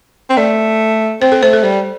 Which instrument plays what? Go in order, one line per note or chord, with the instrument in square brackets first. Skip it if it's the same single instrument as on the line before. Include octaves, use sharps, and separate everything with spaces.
[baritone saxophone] C4
[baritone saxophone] A3 [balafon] D5
[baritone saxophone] C4 [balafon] C5
[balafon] A4
[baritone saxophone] A3 [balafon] C5
[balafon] A4
[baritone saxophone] G3 [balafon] C5